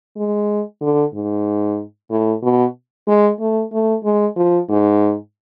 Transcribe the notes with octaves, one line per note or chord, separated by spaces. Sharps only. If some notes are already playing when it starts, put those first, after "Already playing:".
G#3
D3
G#2
A2
B2
G#3
A3
A3
G#3
F3
G#2